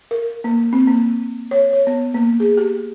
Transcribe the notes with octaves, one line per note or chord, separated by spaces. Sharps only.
A#4
A#3
C4
A#3
C#5
C#5
B3
A#3
G#4
G4